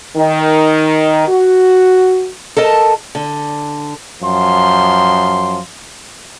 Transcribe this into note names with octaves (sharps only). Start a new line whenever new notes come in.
D#3
F#4
A4 A#4 D#5 A5
D3
F#2 F3 C6